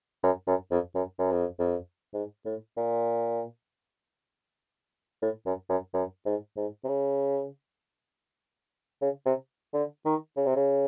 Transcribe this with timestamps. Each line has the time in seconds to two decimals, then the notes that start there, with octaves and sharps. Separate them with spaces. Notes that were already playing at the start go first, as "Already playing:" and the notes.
0.23 F#2
0.47 F#2
0.71 F2
0.95 F#2
1.19 F#2
1.32 F2
1.59 F2
2.14 G#2
2.45 A2
2.77 A#2
5.22 A2
5.46 F#2
5.70 F#2
5.94 F#2
6.25 G#2
6.57 G#2
6.84 C3
6.88 C#3
9.02 C#3
9.26 C3
9.74 D3
10.05 D#3
10.37 C#3
10.46 C3
10.56 C#3